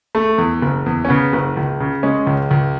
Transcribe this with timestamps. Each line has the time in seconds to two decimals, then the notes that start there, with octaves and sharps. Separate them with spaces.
0.15 A3
0.38 E2
0.62 F#1
0.86 E2
1.05 C#4
1.09 C#3 B3
1.33 F#1
1.57 C#2
1.80 C#3
2.03 G#3 C#4
2.27 C#2
2.51 C#2